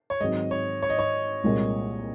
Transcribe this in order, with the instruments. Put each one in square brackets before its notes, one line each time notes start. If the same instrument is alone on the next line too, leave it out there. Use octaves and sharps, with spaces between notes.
[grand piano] C#5
[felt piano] G#2 D#3 F#3 C4 [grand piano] D#5
[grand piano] C#5
C#5
D#5
C#5
[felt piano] C2 A#2 G#3